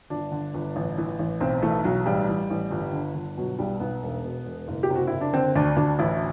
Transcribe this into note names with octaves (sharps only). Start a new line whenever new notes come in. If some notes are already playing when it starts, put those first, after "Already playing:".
G1 D4
D3
G1
A1
E3
A1
B1 C4
E3 A3
B1 F#3
A1 G3
E3
A1
G1
D3
G1
B2 F#3
B1 G3
B1 B3
E1
B2
E1
F#1
G4
C3
F#4
F#1 E4
D4
D3 C4
D2 D4
D2 D4
A1 E4